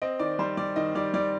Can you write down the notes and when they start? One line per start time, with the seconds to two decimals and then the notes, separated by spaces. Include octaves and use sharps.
0.02 C4 D#5
0.19 D#3 D5
0.39 G3 C5
0.57 G3 D5
0.76 D#3 D#5
0.95 G3 D5
1.14 G3 D5